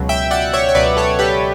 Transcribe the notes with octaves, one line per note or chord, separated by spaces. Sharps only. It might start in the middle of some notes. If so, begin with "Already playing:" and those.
Already playing: C#2 B2 F#3
E5 G5
D5 F#5
C#5 E5
C#5
C#2 B2 F#3 B4 D5
A4 C#5
G4 B4